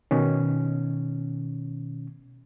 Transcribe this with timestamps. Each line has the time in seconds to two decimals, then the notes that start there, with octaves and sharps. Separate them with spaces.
0.11 B2 D#3 C#4